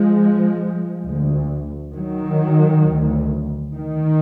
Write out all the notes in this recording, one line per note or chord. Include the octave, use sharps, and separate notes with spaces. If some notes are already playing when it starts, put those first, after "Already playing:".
Already playing: F3 G#3
D2
D#3 F#3
D2
D#3